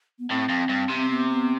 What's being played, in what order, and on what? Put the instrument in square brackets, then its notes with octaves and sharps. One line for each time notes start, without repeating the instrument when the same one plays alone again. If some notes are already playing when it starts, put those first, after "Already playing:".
[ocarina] B3
[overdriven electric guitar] A2 [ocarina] C4
[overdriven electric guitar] F2
G2
C3
[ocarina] C4
B3
B3